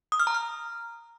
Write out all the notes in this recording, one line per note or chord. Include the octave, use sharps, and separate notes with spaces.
D#6
F6
A#5
F6